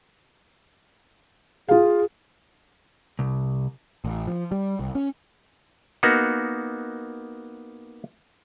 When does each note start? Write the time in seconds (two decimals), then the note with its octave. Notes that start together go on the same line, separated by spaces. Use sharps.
1.69 F4 G#4 F5
3.19 C2
4.05 A1
4.27 F3
4.52 G3
4.80 C2
4.95 C#4
6.03 A#3 B3 D#4 F#4